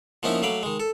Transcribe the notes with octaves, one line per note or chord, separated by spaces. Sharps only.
F3 A#3 B3 C#4 D#4 E4
F#3 A3 F5 B5 D6
D#3 G#3
A4